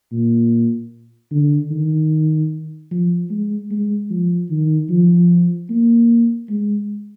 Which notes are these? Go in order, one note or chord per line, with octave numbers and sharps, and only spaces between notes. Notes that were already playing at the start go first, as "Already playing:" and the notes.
A#2
D3
D#3
F3
G#3
G#3
F3
D#3
F3
A#3
G#3